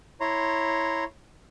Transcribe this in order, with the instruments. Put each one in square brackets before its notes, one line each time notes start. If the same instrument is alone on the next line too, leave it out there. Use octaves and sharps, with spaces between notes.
[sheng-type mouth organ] E4 C#5 A#5 C6